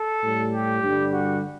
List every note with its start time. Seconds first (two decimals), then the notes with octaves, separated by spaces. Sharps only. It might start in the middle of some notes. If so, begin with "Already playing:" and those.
Already playing: A4
0.23 A2 G3
0.52 G4
0.82 G2 D3 G3
1.12 F#4